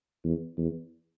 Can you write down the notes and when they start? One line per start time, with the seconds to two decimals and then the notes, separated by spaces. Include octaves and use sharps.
0.24 E2
0.57 E2